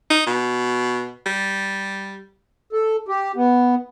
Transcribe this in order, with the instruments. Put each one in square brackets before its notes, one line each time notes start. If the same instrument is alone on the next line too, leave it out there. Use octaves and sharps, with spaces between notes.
[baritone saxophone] D#4
B2
G3
[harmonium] A4
G4
B3